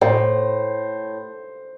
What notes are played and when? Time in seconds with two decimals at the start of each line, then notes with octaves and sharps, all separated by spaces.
0.01 A2 C5